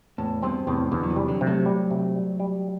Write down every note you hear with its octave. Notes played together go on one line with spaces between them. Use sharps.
E2 A2
G2 B2 C4
E2 A2 C3
E2 B2 D3
F#3
C3 E3
G3
D3 F#3
C3
F#3 A3
G3
C3
G3
G3